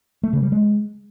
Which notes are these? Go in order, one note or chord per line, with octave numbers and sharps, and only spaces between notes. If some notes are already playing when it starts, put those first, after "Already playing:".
A3
C#3
G3
G#3